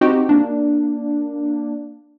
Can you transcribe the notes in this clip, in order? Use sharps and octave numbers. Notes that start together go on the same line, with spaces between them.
C4 D#4 F#4 G4
A#3 D4